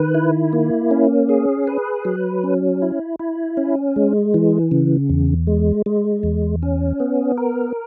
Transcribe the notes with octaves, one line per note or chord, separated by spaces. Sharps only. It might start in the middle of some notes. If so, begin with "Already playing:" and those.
Already playing: D#3 B4
E4
A#3
C#4
G#4
B4
F#3
C#4
E4
E4
C#4
G#3
E3
C#3
E2
G#3
G#3
E2
C#4
B3
A#4